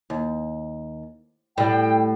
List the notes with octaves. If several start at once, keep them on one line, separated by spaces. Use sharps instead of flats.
D#2
A2 G3 G5